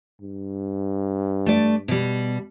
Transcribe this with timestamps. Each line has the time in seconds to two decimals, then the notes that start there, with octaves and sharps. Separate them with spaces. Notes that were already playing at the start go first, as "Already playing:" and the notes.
0.21 G2
1.46 A3 D5
1.88 B2 G3